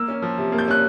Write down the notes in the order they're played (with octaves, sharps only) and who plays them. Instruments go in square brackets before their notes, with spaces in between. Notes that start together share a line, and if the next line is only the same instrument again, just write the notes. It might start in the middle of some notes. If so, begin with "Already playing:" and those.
Already playing: [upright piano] A#3 E6
C#4
F3
C3
A#3
G6
C#4 F#6